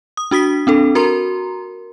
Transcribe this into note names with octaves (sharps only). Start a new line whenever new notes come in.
D#6
D4 F#4 D#6 B6
C4 D4 A4
F#4 A#4 A#5 C6